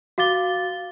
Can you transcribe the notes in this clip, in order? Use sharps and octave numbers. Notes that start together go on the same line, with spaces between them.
F#4 F5 D6 A6 G7